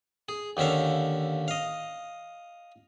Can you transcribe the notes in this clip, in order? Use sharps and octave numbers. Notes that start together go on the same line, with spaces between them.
G#4
D#2 D3 C#4 E5 F5
D#5 F5